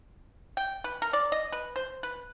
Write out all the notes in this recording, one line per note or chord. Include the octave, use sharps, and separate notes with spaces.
G5
B4
A#4
D5
D#5
B4
C5
B4